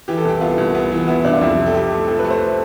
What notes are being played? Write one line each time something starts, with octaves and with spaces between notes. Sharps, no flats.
E3 G4
A4
C2 G4
B3 F4
C2
B3
E3
B3 E4
C2 D4
F4
F2 E4
C3
A4
C3 G4
A3
F3 A4
B4
A3
C5